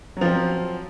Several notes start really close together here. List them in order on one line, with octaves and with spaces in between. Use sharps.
F#3 F3 C4